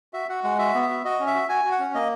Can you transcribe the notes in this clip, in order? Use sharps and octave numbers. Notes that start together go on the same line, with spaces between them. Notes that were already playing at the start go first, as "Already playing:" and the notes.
F#4 E5
F#4 F#5
G#3 F#5
F#4 E5
B3
E5
F#4
F#4 D#5
C#4
E5
F#4
F#4 G#5
F#4
F#5
C#4
A#3 D#5